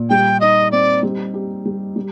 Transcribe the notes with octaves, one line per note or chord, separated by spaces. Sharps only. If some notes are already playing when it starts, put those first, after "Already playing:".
Already playing: A#2
G3 G5
D#4 D#5
C4 D5
G3
G4
G3
G3